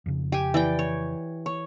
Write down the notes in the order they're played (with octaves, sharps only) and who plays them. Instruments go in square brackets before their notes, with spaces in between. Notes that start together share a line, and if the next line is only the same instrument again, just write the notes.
[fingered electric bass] F2 C#3
[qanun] G4 G#5
E3 D5 G5
C#5
C#5